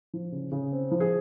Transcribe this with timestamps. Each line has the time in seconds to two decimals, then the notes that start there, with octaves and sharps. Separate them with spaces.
0.14 F3
0.32 C#3
0.52 C#3
0.72 C4
0.91 F3
1.00 G#4